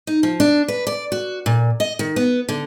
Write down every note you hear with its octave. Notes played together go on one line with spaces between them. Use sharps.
D#4
F3
D4
B4
D5
F#4
A#2
D#5
D#3
B3
D3